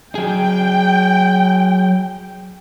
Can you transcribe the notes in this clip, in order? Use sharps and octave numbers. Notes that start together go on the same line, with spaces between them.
F#3 G#4 G5